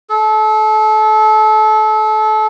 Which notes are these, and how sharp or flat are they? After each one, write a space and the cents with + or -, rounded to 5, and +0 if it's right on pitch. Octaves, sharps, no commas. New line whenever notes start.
A4 -30